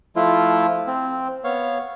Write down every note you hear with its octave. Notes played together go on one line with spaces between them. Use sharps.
F3 A3 E4 F4
C4
B3 C#5 F5